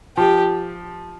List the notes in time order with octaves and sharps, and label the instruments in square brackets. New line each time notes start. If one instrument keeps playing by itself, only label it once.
[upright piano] F3 [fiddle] G4